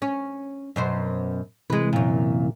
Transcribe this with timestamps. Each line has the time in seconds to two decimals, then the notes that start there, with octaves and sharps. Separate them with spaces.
0.02 C#4
0.76 F#2 B2 C5
1.70 C3 E3 G#3 B4
1.93 F#2 A#2